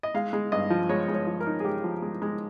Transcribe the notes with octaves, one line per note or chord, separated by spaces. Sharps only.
D#5
G#3 F5
G#3
G2 D#5
F3
G#3 C#5
G#3
C#5
F3
A#4
D#4
G#4
G#3 G4
F3
G#3
G#3